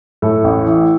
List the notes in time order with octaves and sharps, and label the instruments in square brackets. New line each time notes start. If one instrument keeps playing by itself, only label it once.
[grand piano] A2 A4
A1
E3